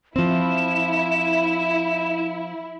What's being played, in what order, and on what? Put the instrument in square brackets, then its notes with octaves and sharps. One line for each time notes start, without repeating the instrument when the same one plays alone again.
[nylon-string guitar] F3 C4 [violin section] E4 [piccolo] E7